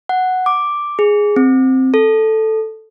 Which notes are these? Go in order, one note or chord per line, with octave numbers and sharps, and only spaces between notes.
F#5
D6
G#4
C4
A4